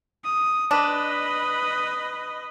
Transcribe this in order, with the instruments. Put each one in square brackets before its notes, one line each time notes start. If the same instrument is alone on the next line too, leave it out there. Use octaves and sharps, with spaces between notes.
[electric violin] D#6
[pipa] D4 [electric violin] B4 D#5